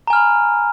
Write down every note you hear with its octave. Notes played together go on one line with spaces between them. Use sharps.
G#5 A#5 B5 F6